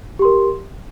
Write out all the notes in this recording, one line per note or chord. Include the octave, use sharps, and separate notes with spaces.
G4 A#4 C6